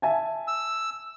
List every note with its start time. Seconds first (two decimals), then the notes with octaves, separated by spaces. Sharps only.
0.02 E5 G#5 A5
0.48 E6